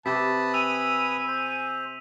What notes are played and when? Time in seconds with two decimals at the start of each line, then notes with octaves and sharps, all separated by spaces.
0.06 C3 G4 B4 A5 B5 D#6 B6
0.54 G#5 E6 D#7 F7
1.28 C5